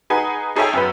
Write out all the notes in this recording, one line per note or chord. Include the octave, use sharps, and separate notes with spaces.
D#4 G#4 B4 F#5 G#5
D#4 G#4 A4 C#5 E5 G5
F#2 B3 B4